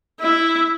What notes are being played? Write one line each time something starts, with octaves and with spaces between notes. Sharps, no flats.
E4